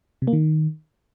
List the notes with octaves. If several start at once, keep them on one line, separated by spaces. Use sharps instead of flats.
C3
A#3
D#3